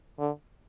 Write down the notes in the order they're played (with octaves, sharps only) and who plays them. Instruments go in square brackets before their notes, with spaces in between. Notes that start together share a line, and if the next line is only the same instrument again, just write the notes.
[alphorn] D3